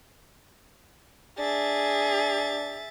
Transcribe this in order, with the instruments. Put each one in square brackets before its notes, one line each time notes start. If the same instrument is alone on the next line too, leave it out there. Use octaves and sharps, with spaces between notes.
[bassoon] D4 [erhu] G#4 [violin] E5 A6